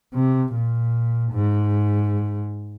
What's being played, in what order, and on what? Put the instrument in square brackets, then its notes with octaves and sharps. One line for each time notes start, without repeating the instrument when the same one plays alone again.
[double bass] C3
A#2
G#2